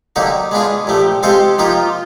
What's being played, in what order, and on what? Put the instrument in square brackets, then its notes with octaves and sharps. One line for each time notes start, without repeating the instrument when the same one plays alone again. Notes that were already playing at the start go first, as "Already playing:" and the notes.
[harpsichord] D3 F#3 A#3 D#4 G4
[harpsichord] G#3 B3 D4 F4 [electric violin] G#4
[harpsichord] A#2 F3 A3 [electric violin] G4
[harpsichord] G#3 C4 F4 A4 C5 [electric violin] G4
[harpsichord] F3 A#3 D#4 G4 [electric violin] F4